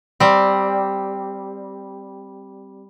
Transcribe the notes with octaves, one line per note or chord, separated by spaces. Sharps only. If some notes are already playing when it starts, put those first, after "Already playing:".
G3 C4